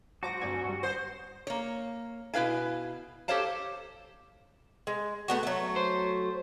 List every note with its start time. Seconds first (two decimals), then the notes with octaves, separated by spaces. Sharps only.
0.23 G#2 F#3 F#4 C5 A5 D6 A#6
0.41 D2 G2 F#3 C4 D5 G#5
0.65 G2 G3
0.83 C5 F#5 D#6
1.47 A#3 C#5
2.34 B2 E4 B4 F5 G#5
3.28 G4 A4 C5 C#5 F5 A5
4.87 G#3
5.28 A3 B3 F#4
5.43 F#3 A3
5.76 C5